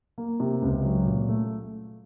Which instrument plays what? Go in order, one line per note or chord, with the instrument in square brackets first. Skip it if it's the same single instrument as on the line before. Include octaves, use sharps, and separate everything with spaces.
[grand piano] A#3
C3
C#2
F#3
A#2
A3